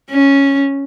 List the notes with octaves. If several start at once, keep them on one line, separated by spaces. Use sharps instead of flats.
C#4